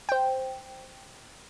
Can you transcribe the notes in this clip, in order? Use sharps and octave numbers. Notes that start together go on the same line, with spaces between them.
C5 G5